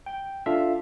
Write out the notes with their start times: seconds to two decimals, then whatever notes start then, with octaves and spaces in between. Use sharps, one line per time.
0.06 G5
0.46 D4 F4 A4 E5 F5